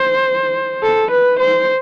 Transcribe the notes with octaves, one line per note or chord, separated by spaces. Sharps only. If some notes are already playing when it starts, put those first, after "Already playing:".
Already playing: C5
A4
B4
C5